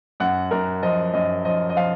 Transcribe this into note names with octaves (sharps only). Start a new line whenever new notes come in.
F#2 F#5
F#2 A#4
F3 D#5
F#2 D#5
F3 D#5
D#5
F3 F5